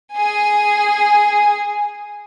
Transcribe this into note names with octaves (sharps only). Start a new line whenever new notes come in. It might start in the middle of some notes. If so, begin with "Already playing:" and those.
G#4 G#5